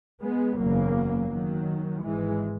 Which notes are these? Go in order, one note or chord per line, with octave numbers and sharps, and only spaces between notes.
G#3 B3
F#1 E2 C#3 F#3 A#3
D#3 F#3
G#1 G#2 E3 G#3